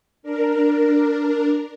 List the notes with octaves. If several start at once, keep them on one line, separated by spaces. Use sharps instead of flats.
D4 A#4